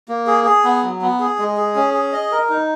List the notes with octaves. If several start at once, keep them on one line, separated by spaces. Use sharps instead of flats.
A#3
G#4
G#4
B3
F#3
B3
G#4
G#3
G#4
C#4
G#4
D#5
A#4
D#4